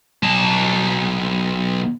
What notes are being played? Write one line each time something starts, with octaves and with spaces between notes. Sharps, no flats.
B1 A5